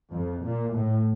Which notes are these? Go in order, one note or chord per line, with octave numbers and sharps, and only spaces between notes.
F2
A#2
A2